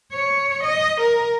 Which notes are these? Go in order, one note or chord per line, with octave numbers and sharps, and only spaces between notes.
C#5
D#5
A#4